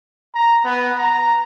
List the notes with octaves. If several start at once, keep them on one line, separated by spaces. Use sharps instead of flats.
A#5
B3
A#5